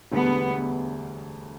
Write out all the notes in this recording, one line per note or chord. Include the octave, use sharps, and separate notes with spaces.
E1 D2 D3 G3 B3